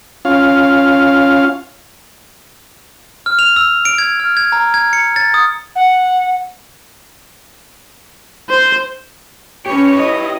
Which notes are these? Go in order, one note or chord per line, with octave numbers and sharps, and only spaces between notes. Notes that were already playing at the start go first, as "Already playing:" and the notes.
C#4 F4 F5
F6
F7
E6
D7
G#6
F6
G#6
A#5
G#6
C#7
A6
D#6
F#5
C5
C#4 G4 B4 C#5
E4 D#5